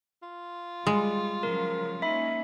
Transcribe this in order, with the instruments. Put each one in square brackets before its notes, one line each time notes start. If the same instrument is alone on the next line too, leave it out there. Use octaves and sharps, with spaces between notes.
[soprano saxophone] F4
[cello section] G3 [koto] G#3
[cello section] C#3 F3 F#3 [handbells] A#4
[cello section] A#3 C#4 D#4 [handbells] E5 B5